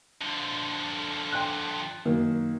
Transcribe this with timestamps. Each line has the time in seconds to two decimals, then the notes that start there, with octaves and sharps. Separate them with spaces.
0.21 D3 F3
1.32 G5 C6 F#6
2.05 F#2 D#3 A#3